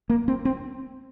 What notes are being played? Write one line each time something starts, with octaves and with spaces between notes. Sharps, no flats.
A#3
C4
C4